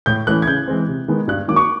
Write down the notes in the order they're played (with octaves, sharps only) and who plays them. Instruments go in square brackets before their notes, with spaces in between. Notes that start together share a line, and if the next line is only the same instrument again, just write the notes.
[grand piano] A2 G6
E3 A3 C#4 E4 F#6
G#6
C#3 G6
E3 G#3 C4
C3
D#3 G#3 B3
G2 F#6
D#3 F#3 A#3 D6
C#6